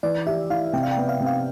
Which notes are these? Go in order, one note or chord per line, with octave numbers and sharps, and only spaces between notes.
E3 D5
G4 E5
E4 F5
C3 G5
F5
G5
B3
F5
C3
F5